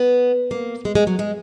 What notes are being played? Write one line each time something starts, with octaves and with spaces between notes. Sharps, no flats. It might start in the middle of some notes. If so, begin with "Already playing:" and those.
Already playing: B3
A#3
G#3
G#3
F#3
G#3